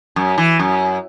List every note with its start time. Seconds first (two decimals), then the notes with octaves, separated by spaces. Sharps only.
0.16 F#2
0.38 E3
0.59 F#2